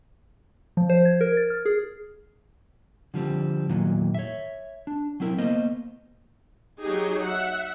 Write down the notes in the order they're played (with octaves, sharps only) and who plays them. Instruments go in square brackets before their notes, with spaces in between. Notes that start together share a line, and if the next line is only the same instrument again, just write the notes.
[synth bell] F3
C5
G#6
A#4
A6
F6
G#4
[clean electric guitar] D3 F3 G3 C4
E2 A#2 D#3 E3 F#3
C#5 E5
D4
F#3 C4 E4 A#4
A#3 B3 C5 D#5
[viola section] F#3 D#4 G4 G#4
E5 F#5